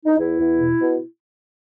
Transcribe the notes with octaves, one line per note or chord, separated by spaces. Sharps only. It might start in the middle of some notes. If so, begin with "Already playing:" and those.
D#4
E2 E4
E2
B2
B2